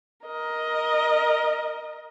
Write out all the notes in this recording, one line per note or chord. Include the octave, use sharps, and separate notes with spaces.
A#4 D#5